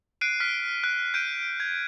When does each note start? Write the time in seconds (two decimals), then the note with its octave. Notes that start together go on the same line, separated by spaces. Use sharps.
0.21 F#6 C7 D7 D#7
0.40 F6 B6
0.84 F#6
1.14 G6 D7 D#7
1.60 G#6